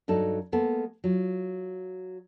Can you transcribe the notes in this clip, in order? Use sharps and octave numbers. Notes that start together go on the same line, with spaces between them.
G2 F#3 D#4 A4
G#3 A#3 B3 A4
F#3 F4